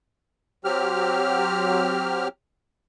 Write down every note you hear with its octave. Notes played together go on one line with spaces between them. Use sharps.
F#3 C4 G4 F6